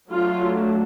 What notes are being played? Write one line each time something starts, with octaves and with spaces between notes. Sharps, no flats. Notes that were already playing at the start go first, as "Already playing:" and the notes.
F#3 A3 D4 F4